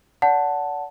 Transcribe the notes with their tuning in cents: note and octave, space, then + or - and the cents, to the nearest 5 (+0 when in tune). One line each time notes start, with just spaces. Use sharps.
D5 -40 F#5 +0 A5 +0